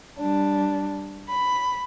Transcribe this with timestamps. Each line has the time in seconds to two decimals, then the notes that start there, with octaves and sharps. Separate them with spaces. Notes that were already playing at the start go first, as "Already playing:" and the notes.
0.18 G3 D4
1.28 B5